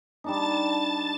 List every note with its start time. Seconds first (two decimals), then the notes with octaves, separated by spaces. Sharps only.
0.24 G3 D4 D#4 A5 A6